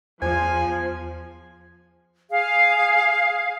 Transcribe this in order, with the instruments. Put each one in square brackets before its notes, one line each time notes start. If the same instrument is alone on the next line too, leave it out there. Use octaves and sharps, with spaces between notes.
[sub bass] E2 [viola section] F3 [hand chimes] C5 [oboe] G#5
[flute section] G#4 F5